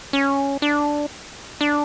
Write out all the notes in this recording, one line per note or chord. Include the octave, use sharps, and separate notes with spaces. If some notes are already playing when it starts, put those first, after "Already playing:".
C#4
D4
D4